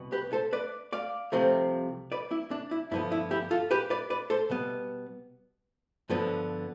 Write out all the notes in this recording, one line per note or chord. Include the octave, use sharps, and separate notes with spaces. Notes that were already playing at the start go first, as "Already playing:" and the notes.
Already playing: C2 B2 B3
G4 B4
A4 C5
B4 D5
D5 F5
C2 C3 F3 A3 C4
B4 D5
E4
D4
E4
G2 D3 F3 B3 E4
E4
E4 G4
F4 A4
G4 B4
B4 D5
B4 D5
A4 C5
B2 G3 B3
G2 D3 F3 B3